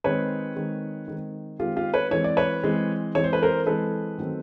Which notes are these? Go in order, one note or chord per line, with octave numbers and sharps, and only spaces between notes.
D#3 G#3 C4 B4 C#5
D#3 G#3 C4
D#3 G#3 C4
D#3 G#3 C4 F4 G4
F4 G4
B4 C#5
E3 G#3 C4 C#5
D5
B4 C#5
E3 G#3 C4
E3 G#3 C4 C#5
C5
B4
A#4 C5
E3 G#3 C4 A4 B4
D#3 F#3 A3 C4